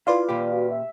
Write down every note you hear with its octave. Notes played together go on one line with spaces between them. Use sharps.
E4 F4 B4 D5 F5 C6
A#2 G4
F#4
E5